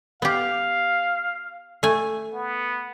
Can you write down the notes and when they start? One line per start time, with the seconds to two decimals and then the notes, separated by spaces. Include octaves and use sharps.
0.22 B3 G4 F5
1.83 A3 G#5
2.34 B3